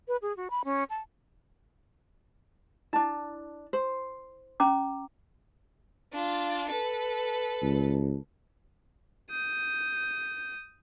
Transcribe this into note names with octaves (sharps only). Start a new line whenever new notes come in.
B4
G#4
F#4
B5
C#4
A5
D4 E4 A5
C5
C#4 A#5 D6
D4 F4
A4 B4
C#2
D#6 G6